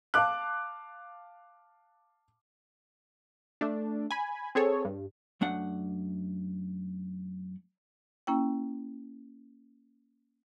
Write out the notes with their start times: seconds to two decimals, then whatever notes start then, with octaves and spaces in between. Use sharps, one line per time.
0.14 F5 A5 D6 F#6
3.61 A3 D4
4.11 G#5 B5
4.55 C4 G#4 A4 C#5
4.85 G2
5.41 F#2 A3 D4 F#5
8.27 A#3 C#4 E4 G5